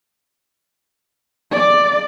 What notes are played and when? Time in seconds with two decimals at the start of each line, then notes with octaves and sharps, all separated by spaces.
1.52 D5